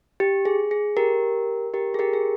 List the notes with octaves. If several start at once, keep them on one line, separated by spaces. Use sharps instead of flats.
G4
G#4
G#4
G4 A#4
G4 A#4
G#4
G4 A#4
G#4